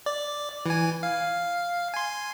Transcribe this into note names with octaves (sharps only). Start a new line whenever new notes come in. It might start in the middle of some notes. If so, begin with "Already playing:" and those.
D5
E3 G#5
F5
G#5 C6